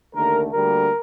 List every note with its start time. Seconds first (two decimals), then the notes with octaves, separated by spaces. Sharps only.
0.14 D#2 D3 A3 A#4
0.52 D2 D3 G3 A#3 A#4